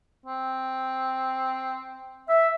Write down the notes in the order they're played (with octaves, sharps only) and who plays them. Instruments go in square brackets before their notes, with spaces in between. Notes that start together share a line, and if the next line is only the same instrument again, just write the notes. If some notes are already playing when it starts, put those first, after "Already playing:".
[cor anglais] C4
[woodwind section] E5